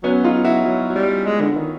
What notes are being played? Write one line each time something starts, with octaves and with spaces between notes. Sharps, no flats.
F#3 B3 C#4
D#4 F4
E4 F#4
F#3
F#3
G3
G#3
D3
D#3